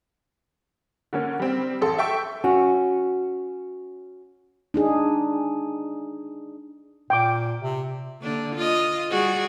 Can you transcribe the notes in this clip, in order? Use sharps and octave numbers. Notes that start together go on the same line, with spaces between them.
D3 A#3 C#4
G3 C4
A1 A4 C6
E5 G5 C#6 E6
C#4 F#4
D4 D#4 G#4
A#2 G5 D6
C3
D3 A#3 D4
F4 D#5
G3 F#4 G#4